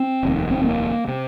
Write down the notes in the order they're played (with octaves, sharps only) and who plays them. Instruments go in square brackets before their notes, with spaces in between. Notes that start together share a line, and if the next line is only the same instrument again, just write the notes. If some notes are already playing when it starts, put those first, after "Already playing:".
Already playing: [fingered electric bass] C4
F1 D#2
C4
A#3
C3